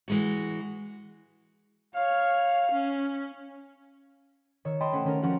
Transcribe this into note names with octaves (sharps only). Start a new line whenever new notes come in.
E3 G#3 F#4
C#5 F5
C#4
D#3 C#5 E6
D#5 G5 A5 B5 C6
A3 C#4 C5 F#5 A5
D#3 C#4 A#4
F3 C#4 F#4 G4 A#4 F#5